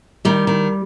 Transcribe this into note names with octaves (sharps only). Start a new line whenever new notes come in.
D#3 G3
D#3